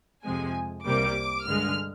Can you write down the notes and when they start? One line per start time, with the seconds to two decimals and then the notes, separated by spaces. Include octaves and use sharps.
0.24 F2 C3 F3 G#3 C4 G#5
0.85 C2 C3 G3 A#3 D6
1.45 G2 D3 G#3 F6